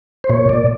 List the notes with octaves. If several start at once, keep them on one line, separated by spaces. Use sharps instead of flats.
C5
A#2 C#5
A#2 D5